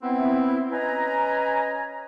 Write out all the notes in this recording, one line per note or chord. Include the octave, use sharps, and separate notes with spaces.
B3 C4 E4
C#4 B4 D#5 G#5 A#5